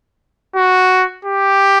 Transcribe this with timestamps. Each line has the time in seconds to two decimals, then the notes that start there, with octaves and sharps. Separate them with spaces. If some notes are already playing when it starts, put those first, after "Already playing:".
0.56 F#4
1.25 G4